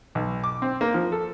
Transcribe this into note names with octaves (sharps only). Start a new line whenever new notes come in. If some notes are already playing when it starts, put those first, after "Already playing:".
B1
D6
C4
A#3
F3
A4